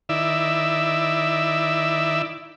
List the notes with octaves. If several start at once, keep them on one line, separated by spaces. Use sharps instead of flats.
D#3 E4 D5 E5